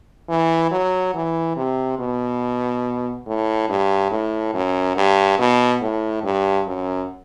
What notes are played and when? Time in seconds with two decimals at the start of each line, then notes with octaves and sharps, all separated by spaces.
0.29 E3
0.71 F#3
1.14 E3
1.56 C3
1.99 B2
3.27 A2
3.69 G2
4.11 A2
4.54 F#2
4.97 G2
5.39 B2
5.82 A2
6.23 G2
6.67 F#2